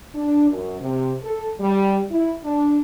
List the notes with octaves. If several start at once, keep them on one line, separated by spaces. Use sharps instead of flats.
D4
F#2
C3
A4
G3
E4
D4